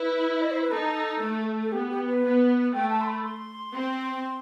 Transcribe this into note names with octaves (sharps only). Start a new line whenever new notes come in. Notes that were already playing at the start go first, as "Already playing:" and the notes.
Already playing: E4 B4
D#5
C5
B4
D#4 A4
A3
A4
B3 G4
G4
B4
B3
A3 G5
A5
C6
B5
C6
C4